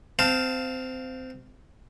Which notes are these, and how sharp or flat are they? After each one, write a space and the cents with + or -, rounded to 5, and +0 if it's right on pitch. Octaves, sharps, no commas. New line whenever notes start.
C4 -20 F5 +0 A5 +5